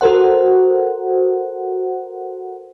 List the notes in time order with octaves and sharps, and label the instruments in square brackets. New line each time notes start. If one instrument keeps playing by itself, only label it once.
[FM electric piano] F#4 A4 A#4 C5 F#5